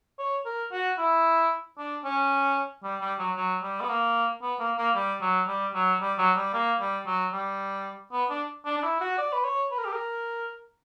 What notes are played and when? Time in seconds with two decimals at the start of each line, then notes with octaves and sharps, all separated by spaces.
0.19 C#5
0.46 A#4
0.72 F#4
0.98 E4
1.78 D4
2.04 C#4
2.84 G3
3.01 G3
3.19 F#3
3.36 F#3
3.63 G3
3.81 B3
3.89 A#3
4.42 B3
4.59 A#3
4.78 A#3
4.95 G3
5.22 F#3
5.48 G3
5.74 F#3
6.01 G3
6.18 F#3
6.36 G3
6.54 A#3
6.80 G3
7.06 F#3
7.33 G3
8.12 B3
8.30 D4
8.65 D4
8.78 D4
8.83 E4
9.01 F#4
9.18 D5
9.33 B4
9.44 C#5
9.71 B4
9.78 A#4
9.85 G4
9.93 A#4